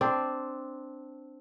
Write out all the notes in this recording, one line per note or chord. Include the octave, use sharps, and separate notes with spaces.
C4 D4